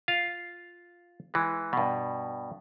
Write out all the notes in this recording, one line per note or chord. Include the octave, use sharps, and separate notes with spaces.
F4 F5
E3 G#3
G2 B2